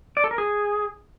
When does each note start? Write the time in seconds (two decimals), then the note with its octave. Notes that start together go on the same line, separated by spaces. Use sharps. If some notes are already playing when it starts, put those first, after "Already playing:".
0.17 D5
0.24 A4
0.31 A#4
0.38 G#4